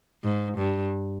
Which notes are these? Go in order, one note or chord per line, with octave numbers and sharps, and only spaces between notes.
G#2
G2